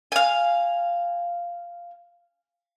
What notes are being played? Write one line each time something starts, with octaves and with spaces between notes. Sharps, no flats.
F5 G#5